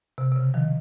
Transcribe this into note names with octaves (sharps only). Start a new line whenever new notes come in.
C3
C3
C#3
D#3 F3